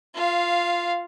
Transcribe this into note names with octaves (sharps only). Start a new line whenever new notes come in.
F4 F5